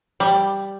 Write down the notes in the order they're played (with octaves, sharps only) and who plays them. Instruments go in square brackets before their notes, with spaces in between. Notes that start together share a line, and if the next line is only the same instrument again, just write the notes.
[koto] G3